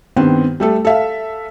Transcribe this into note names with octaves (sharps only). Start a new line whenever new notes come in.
G2 D#3 B3 C4
G3 A3 A4
A4 E5 F5